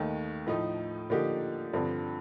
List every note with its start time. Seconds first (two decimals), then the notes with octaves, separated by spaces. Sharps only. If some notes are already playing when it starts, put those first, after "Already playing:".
Already playing: D#2 D#3 A3
0.47 A2 F3 A3 D#4
1.10 D3 F3 A#3 D#4 G4
1.73 G2 D3 F3 C4